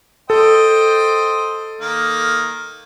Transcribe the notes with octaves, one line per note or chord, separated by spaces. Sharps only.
A4 C5 D#5 G5
D#3 A#3